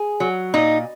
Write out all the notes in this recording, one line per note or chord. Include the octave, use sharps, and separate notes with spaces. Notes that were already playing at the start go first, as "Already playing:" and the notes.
Already playing: G#4
F#3
A#2 D#4